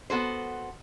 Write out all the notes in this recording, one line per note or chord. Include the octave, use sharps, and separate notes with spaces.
B3 F#4 A4 C5